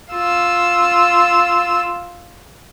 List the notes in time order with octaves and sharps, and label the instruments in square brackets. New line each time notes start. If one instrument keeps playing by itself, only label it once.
[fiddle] F4 E6